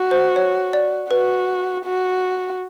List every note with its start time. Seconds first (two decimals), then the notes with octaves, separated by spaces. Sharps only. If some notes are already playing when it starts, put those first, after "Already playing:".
Already playing: F#4
0.11 C5
0.36 C#5
0.73 D5
1.10 F#4 B4
1.85 F#4